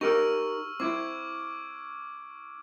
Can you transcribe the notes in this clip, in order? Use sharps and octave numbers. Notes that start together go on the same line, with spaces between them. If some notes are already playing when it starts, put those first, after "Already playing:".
D#4 G4 A#4 C#6 E6 F6
C4 E4 D6 G#6 D7